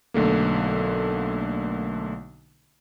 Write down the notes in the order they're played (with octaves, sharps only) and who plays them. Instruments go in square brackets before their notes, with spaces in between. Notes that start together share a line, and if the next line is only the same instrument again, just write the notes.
[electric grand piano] B1 D3 A3 A#3